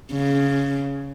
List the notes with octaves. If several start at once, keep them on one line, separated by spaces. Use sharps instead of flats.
C#3